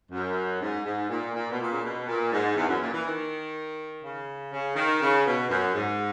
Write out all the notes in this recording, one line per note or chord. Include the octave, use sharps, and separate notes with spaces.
F#2
G#2
G#2
A#2
A#2
B2
A#2
C#3
B2
A#2
G#2
E2
F#2
A#2
E3
D#3
C#3
C#3
D#3
C#3
B2
F#2
G#2